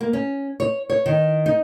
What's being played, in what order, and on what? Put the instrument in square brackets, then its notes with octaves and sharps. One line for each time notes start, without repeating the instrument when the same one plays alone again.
[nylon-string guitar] A#3
C#4
C#5
C#5
D#3
D#4